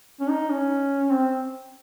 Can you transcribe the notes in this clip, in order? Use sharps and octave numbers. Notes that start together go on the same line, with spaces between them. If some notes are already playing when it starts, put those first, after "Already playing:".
C#4
D#4
C#4
C4